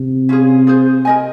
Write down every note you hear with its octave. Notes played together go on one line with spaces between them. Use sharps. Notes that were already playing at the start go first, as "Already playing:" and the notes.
Already playing: C3
C#4 F4 G#4
F4 G#4 C5
A#4 D#5 G#5